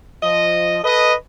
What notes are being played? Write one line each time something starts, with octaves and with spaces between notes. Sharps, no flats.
F3 D#5
A4 B4 D#5